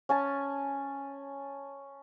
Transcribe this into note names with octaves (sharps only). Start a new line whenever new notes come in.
C#4 G#5 A5